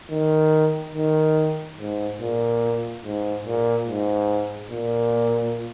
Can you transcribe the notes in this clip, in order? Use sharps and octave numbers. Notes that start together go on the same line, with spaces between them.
D#3
D#3
G#2
A#2
G#2
A#2
G#2
A#2